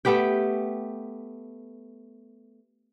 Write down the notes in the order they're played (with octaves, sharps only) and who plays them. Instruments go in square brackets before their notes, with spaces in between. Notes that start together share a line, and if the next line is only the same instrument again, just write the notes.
[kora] A3 B3 G4 G5